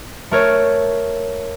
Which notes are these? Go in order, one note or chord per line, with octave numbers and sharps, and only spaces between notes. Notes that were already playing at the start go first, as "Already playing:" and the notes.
A3 A#4 C#5